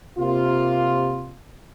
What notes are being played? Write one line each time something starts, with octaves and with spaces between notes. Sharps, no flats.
C3 A#3 F4